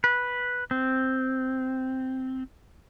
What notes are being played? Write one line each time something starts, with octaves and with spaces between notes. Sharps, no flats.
B4
C4